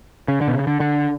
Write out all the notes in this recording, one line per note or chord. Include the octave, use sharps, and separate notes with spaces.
C#3
D3
B2
C#3
D3
D3